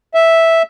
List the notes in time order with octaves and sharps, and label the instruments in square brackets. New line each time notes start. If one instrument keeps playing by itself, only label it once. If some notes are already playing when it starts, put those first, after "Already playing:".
[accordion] E5